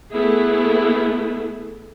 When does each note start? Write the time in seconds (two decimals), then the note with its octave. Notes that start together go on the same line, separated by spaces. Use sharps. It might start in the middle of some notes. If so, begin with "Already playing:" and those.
0.12 A3 B3 E4 G#4